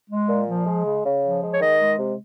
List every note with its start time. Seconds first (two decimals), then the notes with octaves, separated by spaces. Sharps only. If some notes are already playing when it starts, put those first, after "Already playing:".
0.10 G#3
0.29 A#2
0.48 F3
0.66 G#3
0.85 C#3
1.05 C#3
1.24 F3
1.41 G#3
1.54 C#5
1.61 D#3 D#5
1.79 G#3
1.98 C3